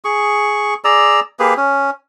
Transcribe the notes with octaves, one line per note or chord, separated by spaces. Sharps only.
G#4 C#6
G#4 D5 A#5 E6
A#3 G4 G#4 B4
C#4